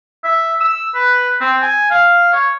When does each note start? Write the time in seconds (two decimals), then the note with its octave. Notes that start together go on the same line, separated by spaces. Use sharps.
0.24 E5
0.60 E6
0.94 B4
1.41 C4
1.62 G#5
1.91 F5
2.33 C#5